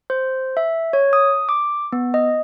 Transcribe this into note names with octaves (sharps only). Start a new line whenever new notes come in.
C5
E5
C#5
D#6
D6
B3
D#5